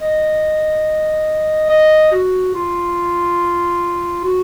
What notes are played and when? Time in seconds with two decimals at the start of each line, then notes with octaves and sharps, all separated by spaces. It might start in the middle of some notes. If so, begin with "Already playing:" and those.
0.01 D#5
1.69 D#5
2.12 F#4
2.55 F4
4.24 F#4